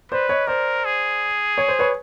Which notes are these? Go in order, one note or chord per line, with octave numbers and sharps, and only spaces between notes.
B4 C5 D5
C#5 D#5
A#4 C5 D5
G#4
C#5
C5
B4 C#5